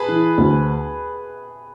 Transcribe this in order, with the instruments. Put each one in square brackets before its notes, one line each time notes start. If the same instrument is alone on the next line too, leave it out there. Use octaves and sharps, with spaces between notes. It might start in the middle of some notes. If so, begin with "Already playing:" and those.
Already playing: [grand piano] G#4 B4 G#5 A5 B5
[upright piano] E3
D2